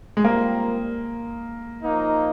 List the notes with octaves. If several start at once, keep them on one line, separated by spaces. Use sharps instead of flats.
G#3
G3 A#3 C4 F4 A#4
F3 A#3 D#4